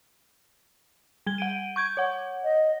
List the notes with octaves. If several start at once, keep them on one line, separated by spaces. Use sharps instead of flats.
G3 G#6 G7
F#5 D7 D#7
C#6 G6 G#6
C#5 F#5
D#5